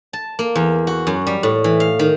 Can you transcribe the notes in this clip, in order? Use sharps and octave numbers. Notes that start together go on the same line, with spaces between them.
A5
A#3
E2
F#4
F#2
G3
A2
E3
F5
D#3